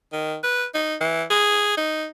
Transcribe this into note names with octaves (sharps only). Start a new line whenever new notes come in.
D#3
B4
D#4
E3
G#4
D#4